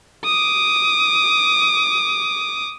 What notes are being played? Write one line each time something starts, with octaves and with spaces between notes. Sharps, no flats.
D6 D#6